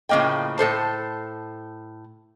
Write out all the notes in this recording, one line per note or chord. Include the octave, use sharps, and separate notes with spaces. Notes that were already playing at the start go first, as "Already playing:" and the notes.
A2 C#3 F3 A#3 D#5 G5
A2 A4 C5 A5